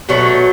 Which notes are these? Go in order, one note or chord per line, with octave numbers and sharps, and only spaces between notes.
B2 F#3 A3